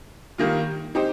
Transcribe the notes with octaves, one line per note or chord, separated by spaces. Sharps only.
D#3 G3 A#3 F4
C4 D#4 G4 C5